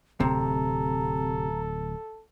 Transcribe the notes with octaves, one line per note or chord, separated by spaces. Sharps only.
D1 C3 A4 A#5